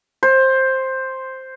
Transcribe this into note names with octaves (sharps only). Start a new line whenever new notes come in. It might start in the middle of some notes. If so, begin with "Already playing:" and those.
C5